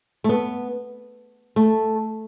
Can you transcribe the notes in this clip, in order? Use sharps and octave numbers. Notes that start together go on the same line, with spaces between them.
A3
B3
A3